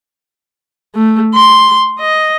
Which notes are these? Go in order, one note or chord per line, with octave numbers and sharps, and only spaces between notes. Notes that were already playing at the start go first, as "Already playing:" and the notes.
A3
C6
D#5